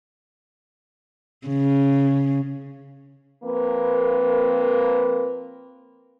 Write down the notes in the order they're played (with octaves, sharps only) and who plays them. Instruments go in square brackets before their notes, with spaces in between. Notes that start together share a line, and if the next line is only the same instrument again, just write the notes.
[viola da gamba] C#3
[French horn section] F3 A#3 C4 A#4 B4